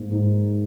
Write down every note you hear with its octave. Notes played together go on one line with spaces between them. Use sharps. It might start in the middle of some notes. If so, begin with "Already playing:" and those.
Already playing: G#2 A#3
G#2